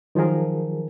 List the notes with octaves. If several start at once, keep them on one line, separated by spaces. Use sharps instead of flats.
D#3 F3 F#3 G#4 A#4